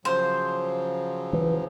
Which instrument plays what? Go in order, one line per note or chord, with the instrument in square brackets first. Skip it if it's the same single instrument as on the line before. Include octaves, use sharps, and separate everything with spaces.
[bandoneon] C#3 F3 F#3 [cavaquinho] C5
[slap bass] E3